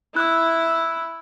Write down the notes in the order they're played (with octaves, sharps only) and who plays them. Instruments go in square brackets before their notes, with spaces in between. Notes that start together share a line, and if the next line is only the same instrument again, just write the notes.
[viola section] E4 [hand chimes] E6 F#6